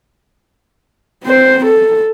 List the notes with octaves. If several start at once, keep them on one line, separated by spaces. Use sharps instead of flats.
C4 C5
A4